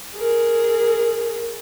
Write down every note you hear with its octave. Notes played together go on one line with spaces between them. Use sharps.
G#4 A#4